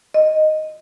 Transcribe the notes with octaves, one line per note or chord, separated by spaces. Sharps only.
D#5